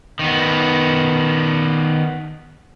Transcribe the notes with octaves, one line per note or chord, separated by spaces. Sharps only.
D#3 B3